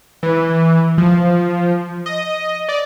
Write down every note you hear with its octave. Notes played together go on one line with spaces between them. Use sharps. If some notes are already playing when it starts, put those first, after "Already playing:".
E3
F3
D#5
D5